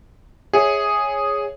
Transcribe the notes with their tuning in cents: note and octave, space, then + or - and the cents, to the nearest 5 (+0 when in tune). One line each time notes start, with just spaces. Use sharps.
G#4 -5 C#5 +0 E5 -20